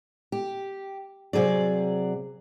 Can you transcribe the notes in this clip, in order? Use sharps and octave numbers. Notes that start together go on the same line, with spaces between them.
G4
C3 F#3 G#4 D5